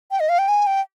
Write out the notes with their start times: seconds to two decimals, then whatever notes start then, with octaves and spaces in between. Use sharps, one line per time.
0.11 G5
0.20 D#5
0.29 F5
0.39 G5
0.48 G#5
0.67 G5